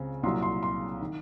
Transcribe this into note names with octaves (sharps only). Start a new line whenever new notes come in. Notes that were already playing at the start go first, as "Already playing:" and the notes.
Already playing: C#2 C#3 C4
C2 A#2 F#3 C6
C6
C6
D#3